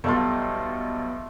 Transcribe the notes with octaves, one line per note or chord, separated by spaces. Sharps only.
B1 G3 A3 F4 A4